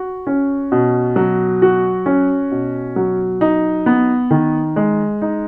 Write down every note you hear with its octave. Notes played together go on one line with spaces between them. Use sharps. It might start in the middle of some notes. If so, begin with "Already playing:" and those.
Already playing: F#4
C#4
B2
F#3
F#4
C#4
B2
F#3
D#4
B3
D#3
G#3
D#4